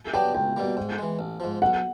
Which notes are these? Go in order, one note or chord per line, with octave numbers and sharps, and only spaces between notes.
F#3 B3 D4 G4 G5
C#2 G5
B2 G3 A#3
G#2
E3 G#3
A1
G#2 F3
B1 F#5